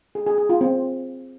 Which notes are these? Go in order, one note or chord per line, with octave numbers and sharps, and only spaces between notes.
G#4
G#4
G#4
F4
C4